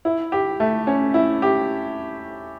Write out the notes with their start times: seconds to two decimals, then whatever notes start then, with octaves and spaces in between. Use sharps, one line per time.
0.05 E4
0.32 G4
0.60 A3
0.87 C#4
1.14 E4
1.42 G4